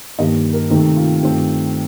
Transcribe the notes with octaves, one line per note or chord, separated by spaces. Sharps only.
G2 D#3 A#3 D#5
A#4
C3 D#3 A3 C4 D#4
F4
G2 D#3 A3 C4